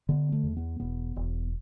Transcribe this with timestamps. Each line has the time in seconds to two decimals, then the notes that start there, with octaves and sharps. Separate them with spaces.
0.09 D3 B3
0.32 A3
0.43 E2
0.57 B3
0.80 E1 B3
1.16 E1